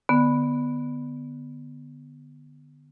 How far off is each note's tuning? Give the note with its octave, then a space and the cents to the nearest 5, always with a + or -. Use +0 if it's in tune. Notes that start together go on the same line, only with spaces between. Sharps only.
D3 +15 B3 +0